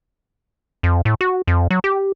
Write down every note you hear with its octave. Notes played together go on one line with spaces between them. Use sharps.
F2
A2
F#4
F2
F#3
G4